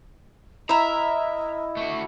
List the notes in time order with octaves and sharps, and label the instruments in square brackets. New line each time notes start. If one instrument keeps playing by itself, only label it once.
[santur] E4 [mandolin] A#4 E5 [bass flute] D#5 [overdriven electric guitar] A#5
[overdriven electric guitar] A3 F#4